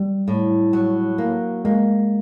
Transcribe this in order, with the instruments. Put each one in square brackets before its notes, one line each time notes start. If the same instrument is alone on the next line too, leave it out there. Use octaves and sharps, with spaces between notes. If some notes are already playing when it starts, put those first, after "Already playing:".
Already playing: [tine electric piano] G3
[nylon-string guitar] A2
F#3
A#3
[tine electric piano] G#3 [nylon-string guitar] A#3